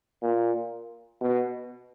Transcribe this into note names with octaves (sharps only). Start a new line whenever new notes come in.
A#2
B2